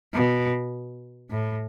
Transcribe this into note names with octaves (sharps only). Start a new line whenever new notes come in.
B2
A2